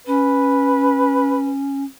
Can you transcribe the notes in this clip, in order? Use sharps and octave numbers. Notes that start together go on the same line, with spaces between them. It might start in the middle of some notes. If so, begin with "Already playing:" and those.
C#4 B4